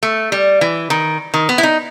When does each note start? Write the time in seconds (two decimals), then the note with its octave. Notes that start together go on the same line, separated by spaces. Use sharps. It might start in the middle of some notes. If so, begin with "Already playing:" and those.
0.03 A3
0.32 G3
0.61 E3
0.90 D#3
1.34 D#3
1.49 B3
1.58 E4
1.63 D#4